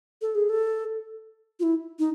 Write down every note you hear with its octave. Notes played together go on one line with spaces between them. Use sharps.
A4
G#4
A4
F4
E4
D#4